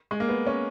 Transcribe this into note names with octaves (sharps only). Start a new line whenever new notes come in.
G#3
A#3
B3
C#4